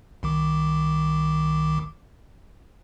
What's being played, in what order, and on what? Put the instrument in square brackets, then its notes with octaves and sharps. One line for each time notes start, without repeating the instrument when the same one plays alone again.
[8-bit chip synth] C2 D#3 D6